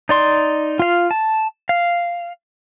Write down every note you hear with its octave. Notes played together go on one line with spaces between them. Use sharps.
D#4 D5 C6
F4 F5
A5
F5